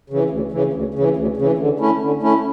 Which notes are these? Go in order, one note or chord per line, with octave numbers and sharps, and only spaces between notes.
C#3 E3
D2
C#3 E3
D2
C#3 E3
D2
C#3 E3
D3
A3 C#4 E4
D3
A3 C#4 E4